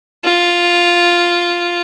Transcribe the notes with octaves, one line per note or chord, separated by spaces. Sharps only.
F4